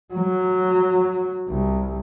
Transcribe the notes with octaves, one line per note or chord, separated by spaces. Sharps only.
F#3
C2